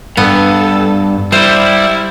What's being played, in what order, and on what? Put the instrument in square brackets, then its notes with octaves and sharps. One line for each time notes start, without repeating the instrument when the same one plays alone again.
[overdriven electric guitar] G2 [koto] B3 [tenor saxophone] A4
[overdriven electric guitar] G3 [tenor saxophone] E4 [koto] C5